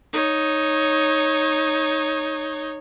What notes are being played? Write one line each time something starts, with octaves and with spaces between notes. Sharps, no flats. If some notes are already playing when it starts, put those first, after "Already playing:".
D#4 C#5